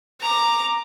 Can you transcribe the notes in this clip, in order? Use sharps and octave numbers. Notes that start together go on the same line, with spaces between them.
A#5 D6